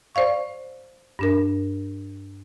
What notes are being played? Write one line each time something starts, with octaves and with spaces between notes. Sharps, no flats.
C5 D5 F5 C#6
G2 D4 A#4